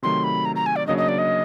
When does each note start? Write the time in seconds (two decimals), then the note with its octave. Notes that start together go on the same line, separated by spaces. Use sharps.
0.03 C3 D#3 F#3 A3 C6
0.24 B5
0.45 A#5
0.56 A#5
0.66 G#5
0.76 D5
0.87 C#3 F#3 A#3 D4 D#5
0.98 D#5
1.08 D5
1.18 D#5